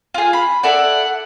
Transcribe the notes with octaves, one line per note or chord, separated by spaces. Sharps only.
F4 G#4
B5
E4 A4 D5 F#5